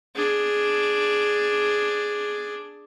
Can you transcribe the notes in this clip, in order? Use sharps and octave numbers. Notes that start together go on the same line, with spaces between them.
D4 G#4